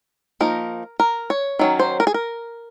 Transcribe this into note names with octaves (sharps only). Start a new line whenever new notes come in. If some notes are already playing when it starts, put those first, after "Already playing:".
F3 A#3 D#4 A#4
A#4
C#5
D#3 F#3 C#4
C5
A#4
G#4
A#4